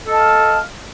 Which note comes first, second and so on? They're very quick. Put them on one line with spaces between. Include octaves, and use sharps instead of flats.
A4 D#5 A5 F5